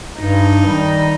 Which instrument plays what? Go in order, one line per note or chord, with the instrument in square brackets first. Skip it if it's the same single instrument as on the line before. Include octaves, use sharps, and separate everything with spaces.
[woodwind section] G2 [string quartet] D#4
[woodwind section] D#3 G3